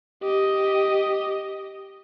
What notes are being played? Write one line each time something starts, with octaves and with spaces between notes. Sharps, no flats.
G4 D#5